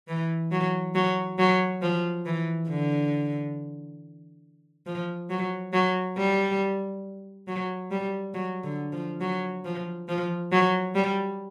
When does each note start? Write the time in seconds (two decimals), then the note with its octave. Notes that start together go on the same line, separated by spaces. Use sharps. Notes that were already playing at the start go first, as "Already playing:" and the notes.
0.08 E3
0.52 F#3
0.95 F#3
1.39 F#3
1.82 F3
2.26 E3
2.69 D3
4.86 F3
5.30 F#3
5.73 F#3
6.17 G3
7.47 F#3
7.91 G3
8.34 F#3
8.64 D3
8.93 F3
9.21 F#3
9.65 F3
10.09 F3
10.52 F#3
10.95 G3